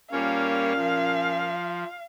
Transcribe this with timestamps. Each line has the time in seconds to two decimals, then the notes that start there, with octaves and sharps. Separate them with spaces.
0.12 A#2 G3 A#3 C#4 C#5 F5
0.76 F3